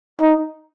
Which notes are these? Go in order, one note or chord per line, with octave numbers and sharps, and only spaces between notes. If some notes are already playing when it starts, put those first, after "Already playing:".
D#4